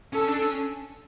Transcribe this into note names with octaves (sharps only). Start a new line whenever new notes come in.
C#4 A4
D4
C#4